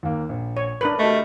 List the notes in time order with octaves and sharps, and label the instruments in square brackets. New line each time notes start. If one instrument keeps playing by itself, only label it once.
[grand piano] D#2 A#3
A#1
[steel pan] C#5
[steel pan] D4 A#4 B4 [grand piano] F#7
[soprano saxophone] A3 [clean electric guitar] F#4 G4 D#5